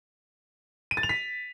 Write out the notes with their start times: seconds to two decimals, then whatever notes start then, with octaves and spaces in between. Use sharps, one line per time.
0.91 D#7
0.97 A6
1.03 F7
1.09 B6